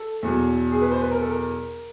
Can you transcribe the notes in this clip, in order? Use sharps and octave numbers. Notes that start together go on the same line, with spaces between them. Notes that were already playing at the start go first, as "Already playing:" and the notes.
Already playing: A4
E2 B2 F#3
G#4
B4
C5
B4
A#4
A4
A#4